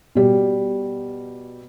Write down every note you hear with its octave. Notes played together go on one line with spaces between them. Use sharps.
B2 G3